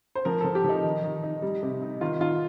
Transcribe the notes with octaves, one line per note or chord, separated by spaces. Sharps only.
C5
F3 A#4
F3 A4
G4
F3 D#4
D#3
D#3
D#4
G3
C3
D#4
D#3 F4
D#3 F4